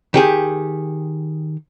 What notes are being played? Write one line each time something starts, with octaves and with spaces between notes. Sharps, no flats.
D#3 G4 G#4